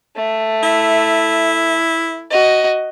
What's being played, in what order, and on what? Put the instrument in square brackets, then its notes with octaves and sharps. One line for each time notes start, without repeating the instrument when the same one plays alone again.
[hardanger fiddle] A3
[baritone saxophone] E4
[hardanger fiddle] F#4 D#5